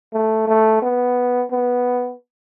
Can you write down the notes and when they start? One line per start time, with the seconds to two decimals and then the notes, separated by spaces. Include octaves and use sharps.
0.13 A3
0.48 A3
0.82 B3
1.52 B3